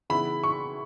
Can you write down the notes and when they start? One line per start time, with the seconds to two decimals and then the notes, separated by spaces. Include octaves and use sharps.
0.10 C#3 E3 B3 E4 B5
0.44 C#6